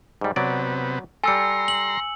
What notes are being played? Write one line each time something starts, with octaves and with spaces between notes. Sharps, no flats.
G#2 G3
C3 F#3 B3 D5
G3 A4 G#5 A#5 C6 E6 C#7
F#7